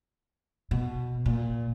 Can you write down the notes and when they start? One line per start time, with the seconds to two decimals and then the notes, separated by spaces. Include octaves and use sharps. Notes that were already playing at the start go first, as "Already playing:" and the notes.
0.71 B2
1.26 A#2